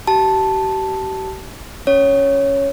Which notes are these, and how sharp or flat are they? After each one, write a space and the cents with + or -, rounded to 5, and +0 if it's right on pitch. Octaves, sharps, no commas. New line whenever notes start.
G4 -40 A5 +0
C#4 +0 C#5 +0